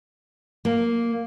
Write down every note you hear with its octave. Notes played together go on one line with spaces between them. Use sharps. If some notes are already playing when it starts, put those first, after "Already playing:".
A#3